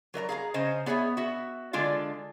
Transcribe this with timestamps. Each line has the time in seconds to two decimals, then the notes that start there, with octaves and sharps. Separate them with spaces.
0.14 F#3 A#4 D#5 A#5
0.29 G#4 F5 A#5
0.54 C#3 C5 D#5 A#5
0.86 B3 G#4 C#5 D5 E5
1.17 F#4 E5
1.73 D3 G#3 D4 F4 F5